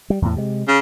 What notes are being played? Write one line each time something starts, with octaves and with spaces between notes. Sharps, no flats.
G3
E2 A2
C3 G#3
C#3